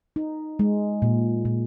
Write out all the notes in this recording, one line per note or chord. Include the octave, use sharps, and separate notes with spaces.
D#4
G#3
A#2
A#2